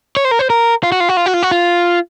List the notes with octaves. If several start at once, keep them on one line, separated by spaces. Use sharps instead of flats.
C#5
C5
A#4
C5
A#4
F4
F#4
F4
F#4
F4
F#4
F4
F#4
F4